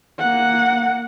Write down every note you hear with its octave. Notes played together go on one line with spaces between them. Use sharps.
A#3 F#5